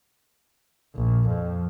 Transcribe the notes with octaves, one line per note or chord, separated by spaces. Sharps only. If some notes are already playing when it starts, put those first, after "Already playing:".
A#1
F2